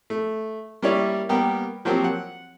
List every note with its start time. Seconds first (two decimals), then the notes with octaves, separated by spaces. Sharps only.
0.10 A3
0.82 G3 A#3 C#4 E4 C#5 D5
1.29 G3 A#3 B3 G4 A#4 G5
1.85 F3 F#3 A#3 C4 G4
2.04 F#5